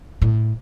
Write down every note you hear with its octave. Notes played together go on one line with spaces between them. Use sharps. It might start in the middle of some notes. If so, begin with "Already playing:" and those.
A2